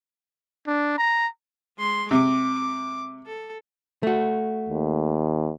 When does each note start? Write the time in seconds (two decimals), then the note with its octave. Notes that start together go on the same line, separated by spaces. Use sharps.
0.67 D4
0.98 A#5
1.78 G#3 C6
2.11 C3 D6
3.26 A4
4.03 A3 F#4
4.69 D#2